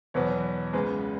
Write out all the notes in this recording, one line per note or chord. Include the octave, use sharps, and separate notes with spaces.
E2 B2 F#3 B3 C#5
C#2 C#3 G#3 B3 B4